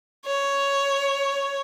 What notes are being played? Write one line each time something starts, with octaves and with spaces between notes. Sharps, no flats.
C#5